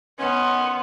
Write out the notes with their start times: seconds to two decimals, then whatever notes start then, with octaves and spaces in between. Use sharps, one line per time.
0.20 D#3 B3 C#4 C6